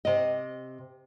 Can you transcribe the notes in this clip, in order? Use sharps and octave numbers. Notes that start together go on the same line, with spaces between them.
C3 D#5